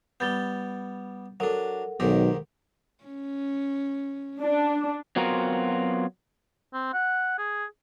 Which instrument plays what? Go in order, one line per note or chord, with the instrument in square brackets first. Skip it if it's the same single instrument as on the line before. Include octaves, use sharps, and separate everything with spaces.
[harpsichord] G3 B3 [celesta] G6 A6 G7
[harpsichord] F#3 D4 [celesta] A4 A#4 F#5
[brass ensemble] B1 [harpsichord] G#2 D#3 G4
[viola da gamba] C#4
[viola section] D4
[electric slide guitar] F#3 B3 C4 F4 F#4 A#4
[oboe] C4
F#5
G#4